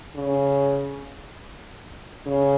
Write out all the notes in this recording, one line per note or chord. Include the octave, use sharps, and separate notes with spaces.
C#3
C#3